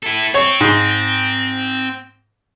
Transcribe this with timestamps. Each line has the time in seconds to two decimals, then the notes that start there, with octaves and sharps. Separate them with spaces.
0.03 E4 A4
0.34 C4 C#5
0.61 G#2